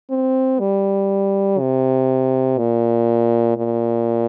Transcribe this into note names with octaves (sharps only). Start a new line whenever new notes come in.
C4
G3
C3
A#2
A#2